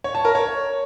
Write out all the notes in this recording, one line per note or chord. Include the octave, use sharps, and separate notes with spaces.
C#5
A5
A#4
C#5